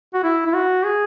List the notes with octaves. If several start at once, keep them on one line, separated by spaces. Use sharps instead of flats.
F#4
E4
E4
F#4
G#4